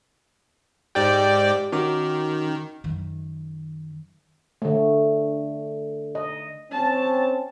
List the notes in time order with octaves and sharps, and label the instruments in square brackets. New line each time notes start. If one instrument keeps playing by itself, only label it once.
[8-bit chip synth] G#2 D5 G5 [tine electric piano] G4
[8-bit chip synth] D#3 [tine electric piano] C#4 F#4 D6
[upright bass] F#2 D#3
[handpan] D3 A3
D#5
[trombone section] C4 C#4 [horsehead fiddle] A5